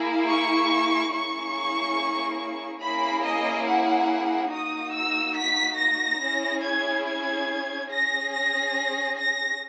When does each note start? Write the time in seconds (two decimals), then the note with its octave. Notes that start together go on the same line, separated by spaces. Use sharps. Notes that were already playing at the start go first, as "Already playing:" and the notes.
Already playing: A#3 E4 G#4
0.28 C#6
1.12 A#3 C#4 E4 G#4 C#6
2.82 A#3 C#4 E4 G#4 B5
3.24 D#5
3.67 F#5
4.51 A#3 D#4 F#4 D#6
4.93 E6
5.36 B6
5.78 A#6
6.21 C#4 E4 G#4
6.63 G#6
7.06 G#6
7.90 C#4 G#4 A#6
8.33 A#6
9.18 A#6